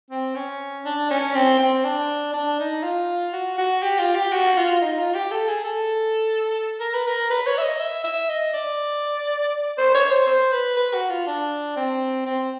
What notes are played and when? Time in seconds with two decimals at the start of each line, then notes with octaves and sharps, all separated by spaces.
0.10 C4
0.35 C#4
0.85 D4
1.10 C#4
1.35 C4
1.60 C4
1.85 D4
2.33 D4
2.59 D#4
2.83 F4
3.33 F#4
3.58 F#4
3.82 G4
3.99 F4
4.15 G4
4.32 F#4
4.57 F4
4.82 D#4
4.99 F4
5.15 G4
5.31 A4
5.48 G#4
5.64 A4
6.80 A#4
6.94 B4
7.07 A#4
7.30 B4
7.47 C#5
7.58 E5
7.63 D#5
7.80 E5
8.04 E5
8.29 D#5
8.54 D5
9.78 C5
9.94 C#5
10.11 C5
10.27 C5
10.52 B4
10.76 B4
10.94 F#4
11.09 F4
11.27 D4
11.76 C4
12.26 C4